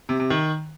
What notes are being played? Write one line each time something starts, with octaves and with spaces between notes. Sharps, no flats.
C3
C3
D#3